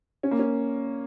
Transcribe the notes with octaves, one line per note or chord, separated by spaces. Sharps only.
C#4
A#3
C#4